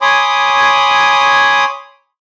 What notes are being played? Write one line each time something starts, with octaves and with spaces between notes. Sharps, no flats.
C#5 G#5 B5 C6 D6 D#6